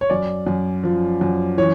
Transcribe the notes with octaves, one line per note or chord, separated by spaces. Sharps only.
C#5
F#2 D5
F#2
F3
F#2
E3 C#5